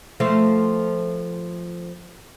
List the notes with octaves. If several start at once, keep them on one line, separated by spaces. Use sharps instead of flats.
F3 A3 C4